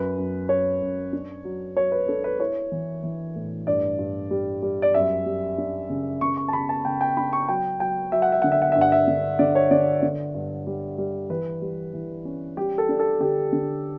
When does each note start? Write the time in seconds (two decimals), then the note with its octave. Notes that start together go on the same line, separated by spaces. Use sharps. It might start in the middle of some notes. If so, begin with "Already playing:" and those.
Already playing: F#2 B4
0.18 F#2
0.49 F#2 C#5
0.81 F#2
1.13 D4
1.45 F#3
1.76 F#3 C#5
1.92 B4
2.08 D4 A4
2.24 B4
2.40 E4 C#5
2.72 E3
3.03 E3
3.35 A2
3.67 G2 D5
3.99 G2
4.31 G3
4.62 G3
4.82 D5
4.94 F#2 E5
5.26 G3
5.58 D4
5.90 C#3
6.21 C#3 C#6
6.37 C#6
6.48 A5
6.53 C#3 B5
6.69 A5
6.85 C#3 G5
7.01 G5
7.17 D4 B5
7.33 C#6
7.49 F#3 G5
7.80 F#3 G5
8.12 F#3 E5
8.22 F#5
8.32 E5
8.42 D3 F#5
8.52 E5
8.62 F#5
8.72 G2 E5
8.81 F#5
8.92 E5
9.08 D3
9.39 D3 D5
9.55 C#5
9.71 D3 D5
10.03 D3
10.34 G2
10.67 G3
10.98 G3
11.30 E3 B4
11.62 G3
11.93 E3
12.25 C#4
12.57 G3 G4
12.78 A4
12.89 D4
12.99 A4
13.20 D3 G4
13.53 D3